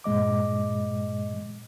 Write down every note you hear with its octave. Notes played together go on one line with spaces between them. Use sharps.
G2 A#2 G#3 D#5 D6